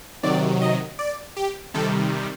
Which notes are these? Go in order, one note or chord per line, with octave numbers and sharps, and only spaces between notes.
C3 D#3 F#3 D5
D#5
D5
G4
C3 D#3 G3 A4